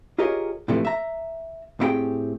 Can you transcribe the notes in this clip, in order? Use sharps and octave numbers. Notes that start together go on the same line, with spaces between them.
F4 G4 G#4 A#4 C#5 D#5
A2 C3 E3 F3 A3 D4
E5 A#5
A2 C4 E4 G4 G#4 G5